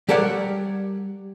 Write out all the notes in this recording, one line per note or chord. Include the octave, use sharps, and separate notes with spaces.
G3 G4 A4 A#4 C#5 F#5